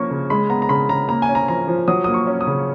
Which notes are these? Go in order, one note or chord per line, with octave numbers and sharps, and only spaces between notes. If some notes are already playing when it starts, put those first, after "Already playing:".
Already playing: F3 A#3 C#4 C#6
C#3
G#3 B5
B3 A#5
A#5
C#3 B5
C#3 A#5
A#3 A#5
G#5
C#4
A#5
F3 A#5
F3
F#3 D#6
D#6
A#3
C#6
C#4
D#6
C#3